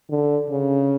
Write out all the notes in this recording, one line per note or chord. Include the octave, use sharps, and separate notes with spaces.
D3
C#3